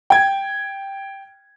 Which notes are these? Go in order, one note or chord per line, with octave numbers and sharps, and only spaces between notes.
G5 G#6